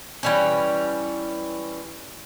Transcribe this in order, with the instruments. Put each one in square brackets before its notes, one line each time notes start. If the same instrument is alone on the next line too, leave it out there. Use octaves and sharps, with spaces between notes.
[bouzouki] E3 G3 C#4